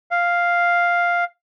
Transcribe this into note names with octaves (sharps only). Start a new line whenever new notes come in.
F5